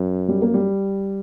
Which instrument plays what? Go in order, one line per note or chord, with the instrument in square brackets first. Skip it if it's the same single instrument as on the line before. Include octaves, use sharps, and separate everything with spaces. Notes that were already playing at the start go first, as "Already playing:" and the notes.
Already playing: [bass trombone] F#2
[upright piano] G3
A#3
G3